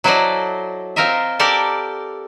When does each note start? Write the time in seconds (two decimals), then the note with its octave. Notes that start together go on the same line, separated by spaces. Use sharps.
0.04 F#3 E4 A4 C5 D5 D#5
0.96 C4 F4 A#4 D#5 E5
1.39 G4 A4 A#4 D5 A5